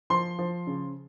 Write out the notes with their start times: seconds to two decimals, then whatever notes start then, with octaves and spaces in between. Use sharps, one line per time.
0.10 F3 C6
0.39 F3
0.67 C#3